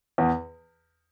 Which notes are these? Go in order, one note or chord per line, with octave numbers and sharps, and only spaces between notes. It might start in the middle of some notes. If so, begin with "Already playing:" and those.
E2